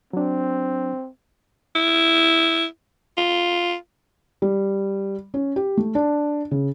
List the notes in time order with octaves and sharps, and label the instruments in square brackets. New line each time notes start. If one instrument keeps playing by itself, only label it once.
[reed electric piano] F#3 D4 [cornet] C4
[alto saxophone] E4
F4
[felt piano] G3
C#4
G4
A3
D4
C#3